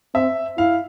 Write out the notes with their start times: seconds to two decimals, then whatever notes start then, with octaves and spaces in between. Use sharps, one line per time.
0.14 C4 E5
0.57 E4 F5